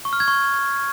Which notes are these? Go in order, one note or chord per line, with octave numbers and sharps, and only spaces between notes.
C#6
F6
G#6
C#6